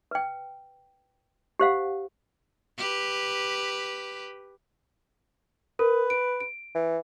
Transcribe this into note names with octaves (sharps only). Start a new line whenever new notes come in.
B4 G5
G4 C5 F5 F#5
G4 B4
A#4 B4
D7
D7
E3